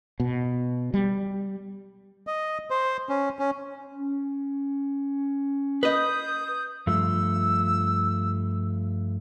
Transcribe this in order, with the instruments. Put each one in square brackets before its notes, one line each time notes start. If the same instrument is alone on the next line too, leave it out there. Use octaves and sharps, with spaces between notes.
[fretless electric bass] B2
G3
[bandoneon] D#5
C5
C#4
C#4
[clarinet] C#4
[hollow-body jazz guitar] B4 D#5 [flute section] D#6 G6
[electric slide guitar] G2 F3 A3 [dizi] E6